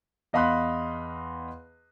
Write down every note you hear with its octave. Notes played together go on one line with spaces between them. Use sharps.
E2 D#5 F5 B5 C6 F#6